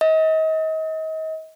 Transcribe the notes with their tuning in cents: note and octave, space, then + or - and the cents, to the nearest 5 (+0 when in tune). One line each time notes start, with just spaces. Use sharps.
D#5 +35